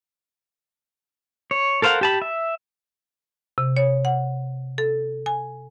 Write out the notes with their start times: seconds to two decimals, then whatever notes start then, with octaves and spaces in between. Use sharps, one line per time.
1.51 C#5
1.82 A4 A#4 C5 F5 F#5
2.01 G4 A5 B5
2.22 E5
3.58 C3
3.77 C#5
4.05 F#5
4.78 A4
5.26 G#5